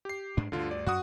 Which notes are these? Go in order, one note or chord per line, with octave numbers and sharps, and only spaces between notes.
G4 C7
G#2 D4
D2 G2 D3 F4
D5
F#2 F#4 F#5 D#6